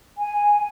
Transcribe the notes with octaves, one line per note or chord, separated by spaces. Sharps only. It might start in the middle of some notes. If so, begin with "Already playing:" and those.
G#5